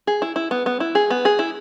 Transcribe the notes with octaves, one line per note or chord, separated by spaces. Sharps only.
G#4
E4
E4
B3
B3
E4
G#4
B3
G#4
E4